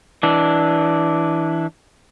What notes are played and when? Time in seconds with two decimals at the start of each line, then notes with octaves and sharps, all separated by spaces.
0.23 E3 D4